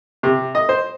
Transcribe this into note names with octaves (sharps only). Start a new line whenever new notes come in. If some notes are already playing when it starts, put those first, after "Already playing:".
C3
D#5
C5